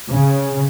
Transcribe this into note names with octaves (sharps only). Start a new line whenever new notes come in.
C#3